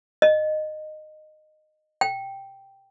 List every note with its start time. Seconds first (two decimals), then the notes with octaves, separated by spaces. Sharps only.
0.22 D#5
2.01 G5